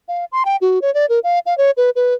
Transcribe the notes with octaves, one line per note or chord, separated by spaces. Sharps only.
F5
C6
G5
F#4
C#5
D5
A#4
F5
F5
C#5
B4
B4